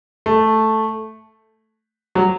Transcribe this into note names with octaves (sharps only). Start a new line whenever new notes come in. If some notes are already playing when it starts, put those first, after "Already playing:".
A3
F#3